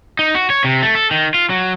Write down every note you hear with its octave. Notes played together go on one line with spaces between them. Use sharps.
D#4
F#4
C#5
C3
A3
A4
D#3
F4
F#3